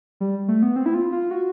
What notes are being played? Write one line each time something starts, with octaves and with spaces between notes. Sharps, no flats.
G3
A3
B3
C4
E4
F4
F4
F#4